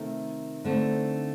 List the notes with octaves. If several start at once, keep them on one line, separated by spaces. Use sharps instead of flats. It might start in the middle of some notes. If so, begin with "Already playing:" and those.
Already playing: C3 D#3 A3
D3 A3 C4 D#4